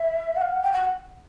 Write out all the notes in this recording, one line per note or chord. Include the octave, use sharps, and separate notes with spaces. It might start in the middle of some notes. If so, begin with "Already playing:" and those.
Already playing: E5
F#5
F5
F#5
G5
F#5